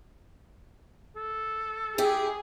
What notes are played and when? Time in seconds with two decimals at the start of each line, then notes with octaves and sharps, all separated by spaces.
1.16 A4
1.98 E4 G4 G#4